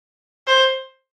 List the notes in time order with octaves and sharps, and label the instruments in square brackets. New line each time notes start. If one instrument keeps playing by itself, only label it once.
[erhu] C5